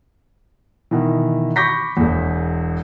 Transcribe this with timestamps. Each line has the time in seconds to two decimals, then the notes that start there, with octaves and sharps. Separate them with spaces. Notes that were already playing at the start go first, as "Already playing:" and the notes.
0.91 B2 D#3 E3
1.56 B5 C#6 D6 G6 A#6 B6
1.97 E1 E2